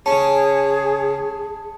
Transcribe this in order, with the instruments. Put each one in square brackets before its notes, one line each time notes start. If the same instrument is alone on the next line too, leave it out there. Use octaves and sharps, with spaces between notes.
[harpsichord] C#3 C#4 [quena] G#4 [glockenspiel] A5